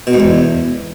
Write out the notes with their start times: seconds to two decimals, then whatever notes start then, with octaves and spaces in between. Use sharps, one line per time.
0.07 B2
0.13 G#2
0.20 E2